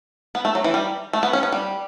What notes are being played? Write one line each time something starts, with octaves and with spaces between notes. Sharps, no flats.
B3
A3
F#3
E3
G3
A3
B3
C#4
B3
G3